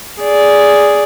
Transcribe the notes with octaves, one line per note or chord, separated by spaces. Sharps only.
G#4 D5